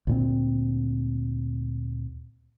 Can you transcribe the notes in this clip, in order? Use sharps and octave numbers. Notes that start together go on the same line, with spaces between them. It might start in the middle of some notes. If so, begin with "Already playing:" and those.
D2 A#2 C4